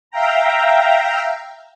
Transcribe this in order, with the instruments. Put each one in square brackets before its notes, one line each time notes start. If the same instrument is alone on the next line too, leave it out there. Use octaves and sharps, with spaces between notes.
[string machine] E5 F5 G5 A#5